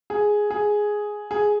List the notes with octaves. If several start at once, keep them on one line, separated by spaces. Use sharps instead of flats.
G#4
G#4
G#4